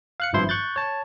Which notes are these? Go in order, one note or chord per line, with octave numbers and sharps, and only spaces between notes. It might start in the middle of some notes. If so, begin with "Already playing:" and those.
F5 F#6 C#7
G#1 G2 F3 E4 C5 C6
C#6 F#6 G6 A6
C#5 A5